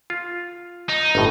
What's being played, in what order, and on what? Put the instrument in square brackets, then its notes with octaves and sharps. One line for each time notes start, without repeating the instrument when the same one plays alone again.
[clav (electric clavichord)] F4
[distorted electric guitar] D#4
[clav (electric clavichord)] G1 A2